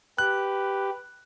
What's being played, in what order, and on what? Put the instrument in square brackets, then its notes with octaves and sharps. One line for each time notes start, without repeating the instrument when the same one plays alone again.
[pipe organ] G4 [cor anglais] B4 [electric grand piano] F#6